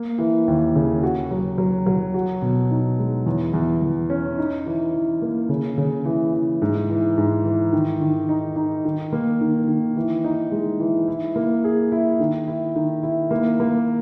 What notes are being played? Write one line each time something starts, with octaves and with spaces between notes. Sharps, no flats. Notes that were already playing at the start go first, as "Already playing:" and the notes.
Already playing: A#3
E3
D#2
C#3
F#4
F#3
F#3
F#3
F#4
B2
D#4
G#3
E2
E2
E2
C#4
D#4
E3
E3
A#3
C#3
C#3
E3
E3
G#2
E3
G#2
E3
D#3
D#3
D#4
D#4
D#3
A#3
D#3
D#3
E3
D#4
G#3
E3
E4
A#3
G#4
E4
D#3
E4
D#3
E4
A#3
A#3